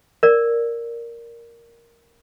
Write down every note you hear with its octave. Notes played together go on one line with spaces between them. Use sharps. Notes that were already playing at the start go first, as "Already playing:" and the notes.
A#4 D5